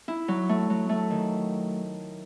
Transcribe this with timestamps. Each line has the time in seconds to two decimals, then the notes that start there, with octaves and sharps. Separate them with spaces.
0.08 E4
0.28 F#3
0.49 A3
0.70 F#3
0.89 A3
1.10 D#3